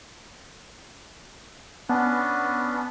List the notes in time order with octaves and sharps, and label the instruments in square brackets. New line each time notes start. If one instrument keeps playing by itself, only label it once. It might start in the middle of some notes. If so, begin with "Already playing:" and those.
[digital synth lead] B3 [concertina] C#4 D4